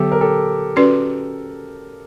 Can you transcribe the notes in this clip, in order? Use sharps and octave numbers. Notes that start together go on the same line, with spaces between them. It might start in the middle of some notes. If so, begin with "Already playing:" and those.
Already playing: D3 F#3 B3 G4 A4
A#4
G4 A4
C#4 F#4 B4 D5